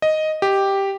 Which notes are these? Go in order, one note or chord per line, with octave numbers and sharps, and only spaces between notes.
D#5
G4